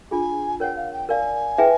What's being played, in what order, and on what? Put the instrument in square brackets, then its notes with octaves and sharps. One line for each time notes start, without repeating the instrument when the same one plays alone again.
[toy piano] D4 F4 G#4 [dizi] G#5
[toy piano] A#4 C#5 F#5 [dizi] G5
[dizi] F5
G5
[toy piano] A#4 D5 F5 [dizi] G#5
[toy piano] E4 G#4 B4 E5 G5